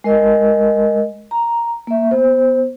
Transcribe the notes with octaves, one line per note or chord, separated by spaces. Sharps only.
G#3 A#4 D#5
A#5
A#3 E5
B3 C5